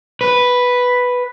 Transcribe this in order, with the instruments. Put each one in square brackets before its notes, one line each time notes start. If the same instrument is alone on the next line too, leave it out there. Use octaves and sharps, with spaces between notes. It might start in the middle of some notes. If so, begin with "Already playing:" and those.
[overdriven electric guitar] B4